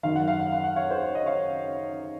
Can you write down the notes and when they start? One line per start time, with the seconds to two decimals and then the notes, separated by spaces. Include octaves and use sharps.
0.03 F#2 D#3 F5
0.16 F#5
0.28 F5
0.40 F#5
0.52 F5
0.64 F#5
0.76 C#5 F5
0.91 C5
1.03 C#5
1.15 D#5
1.26 C#5 F5